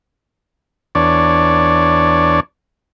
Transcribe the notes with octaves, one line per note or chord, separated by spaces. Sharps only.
E2 D4 C#5 D5